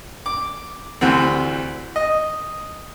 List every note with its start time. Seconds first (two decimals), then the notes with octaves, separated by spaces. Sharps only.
0.26 D6
1.01 D2 C3 E3 C4
1.96 D#5